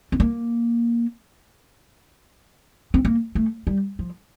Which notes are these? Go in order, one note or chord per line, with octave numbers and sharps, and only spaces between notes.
C4
A#3
C4
A#3
A3
G3
F3